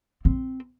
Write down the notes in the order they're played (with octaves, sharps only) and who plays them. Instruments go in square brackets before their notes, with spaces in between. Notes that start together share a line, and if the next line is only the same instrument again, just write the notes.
[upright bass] C4